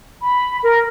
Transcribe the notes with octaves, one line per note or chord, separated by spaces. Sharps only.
B5
A#4